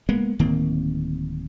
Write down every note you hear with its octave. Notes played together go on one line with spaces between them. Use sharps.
G#3 A#3 B3
D1 D#3 A#3 C4